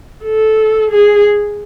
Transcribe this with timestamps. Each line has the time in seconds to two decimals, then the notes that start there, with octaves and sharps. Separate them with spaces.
0.24 A4
0.91 G#4